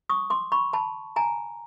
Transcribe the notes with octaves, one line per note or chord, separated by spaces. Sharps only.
C#6 D#6
C6 D6
B5 C#6
A5 B5
G#5 A#5